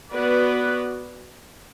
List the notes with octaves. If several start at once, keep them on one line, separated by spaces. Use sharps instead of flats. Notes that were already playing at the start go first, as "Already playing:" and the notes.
B3 F#4 B4 D5